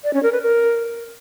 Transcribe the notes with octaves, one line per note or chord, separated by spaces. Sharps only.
D5
C#4
A#4
B4
A#4